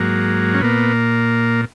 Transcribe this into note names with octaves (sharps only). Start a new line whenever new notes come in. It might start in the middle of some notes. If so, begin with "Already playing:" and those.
Already playing: G#2 F#3 A#3
C#4
A#2 A#3 B3